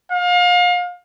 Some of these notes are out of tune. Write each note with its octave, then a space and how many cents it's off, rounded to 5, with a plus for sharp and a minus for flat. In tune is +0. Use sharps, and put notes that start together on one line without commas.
F5 +35